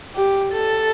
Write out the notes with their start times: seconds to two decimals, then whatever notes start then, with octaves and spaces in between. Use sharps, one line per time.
0.16 G4
0.53 A4